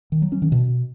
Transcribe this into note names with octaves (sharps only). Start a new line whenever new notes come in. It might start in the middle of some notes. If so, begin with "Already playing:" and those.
D#3
F#3
C#4
D#3
B2